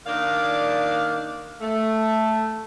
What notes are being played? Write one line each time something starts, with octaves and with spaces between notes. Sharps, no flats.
D#3 A#3 D4 D5 F5
A3